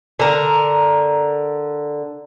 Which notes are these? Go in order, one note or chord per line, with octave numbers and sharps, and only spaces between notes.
D3 A#4